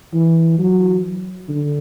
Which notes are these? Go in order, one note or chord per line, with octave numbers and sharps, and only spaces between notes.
E3
F#3
D3